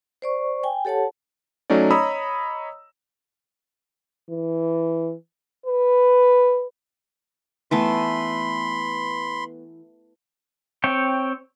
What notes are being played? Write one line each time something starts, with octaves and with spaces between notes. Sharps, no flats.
C5 D5 C#6
G5 G#5
G4 A4 C#5 F#5 A5
F#3 A3 C#4 D#4 D5
C#5 D#5 A#5 B5 D#6 E6
E3
B4
E3 A3 B3 B5 C6
C4 C#5 G5